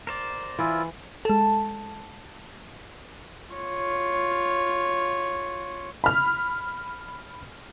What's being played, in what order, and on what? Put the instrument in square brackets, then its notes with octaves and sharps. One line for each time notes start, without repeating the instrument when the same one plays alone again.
[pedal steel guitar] A#4 C5 D5
[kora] E3 [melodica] E4 F4
[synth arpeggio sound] G#3 A4 [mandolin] A5
[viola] F4 C#5
[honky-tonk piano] B5 F6